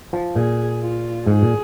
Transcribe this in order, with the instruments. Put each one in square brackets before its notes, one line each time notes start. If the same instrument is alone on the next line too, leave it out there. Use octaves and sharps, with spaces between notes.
[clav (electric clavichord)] F3
[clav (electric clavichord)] A#2 [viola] G#4
[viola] F4
[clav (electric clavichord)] G#2 [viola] G#4
[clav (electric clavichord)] A#2